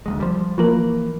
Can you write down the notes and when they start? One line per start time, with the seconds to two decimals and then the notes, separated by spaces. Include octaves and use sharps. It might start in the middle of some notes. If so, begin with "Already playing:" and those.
0.06 D2 F#3 G#3
0.20 F3 G3
0.58 E3 F3 A#3 A#4